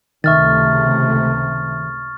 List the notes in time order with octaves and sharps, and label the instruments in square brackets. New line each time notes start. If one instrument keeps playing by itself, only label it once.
[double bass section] C#2 C3 A3 [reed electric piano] D#3 E5 [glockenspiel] C#6 F6 A6